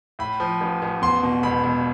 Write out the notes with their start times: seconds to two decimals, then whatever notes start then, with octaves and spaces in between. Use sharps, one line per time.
0.19 A2 B5
0.40 F3
0.61 A1
0.82 A1
1.02 E2 C6
1.23 B2
1.43 E1 B5
1.64 E1